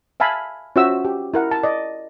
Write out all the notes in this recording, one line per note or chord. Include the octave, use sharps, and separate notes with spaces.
E5 F5 G#5 A5 B5
C#4 F4 F#4 C5 E5 E6
G4
E4 A#4 F#5
A5
D5 D#5